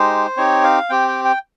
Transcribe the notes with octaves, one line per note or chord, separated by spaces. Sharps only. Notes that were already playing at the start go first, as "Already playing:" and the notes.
Already playing: G#3 D#4 G4 C5
C4 D#4 G4 C#5
F5
C4 G4 G5
G5
G5